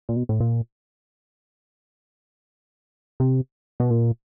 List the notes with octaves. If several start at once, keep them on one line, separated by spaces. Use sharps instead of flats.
A#2
B2
A2
A#2
C3
B2
A#2